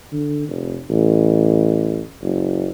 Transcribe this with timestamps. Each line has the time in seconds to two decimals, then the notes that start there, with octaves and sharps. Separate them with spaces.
0.12 D3
0.48 F1
0.90 A1
2.22 F#1